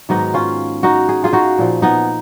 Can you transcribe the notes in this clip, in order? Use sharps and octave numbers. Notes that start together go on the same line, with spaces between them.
G#2 D#3 F#3 B3 D#4
C#4 F4
D#4 F#4
G#4
F4 G#4
D#4 F#4
A#2 F3
B3 D#4